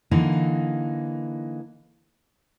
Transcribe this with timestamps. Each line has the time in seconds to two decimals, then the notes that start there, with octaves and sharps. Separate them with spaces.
0.11 D3 E3 A#3 D#4